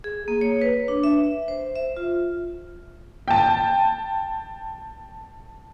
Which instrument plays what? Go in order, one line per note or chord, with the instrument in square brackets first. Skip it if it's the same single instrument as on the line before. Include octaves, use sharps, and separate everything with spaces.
[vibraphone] G#4
A#3
C#5
B4
D4
E5
C5
E5
F4
[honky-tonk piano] G5 A5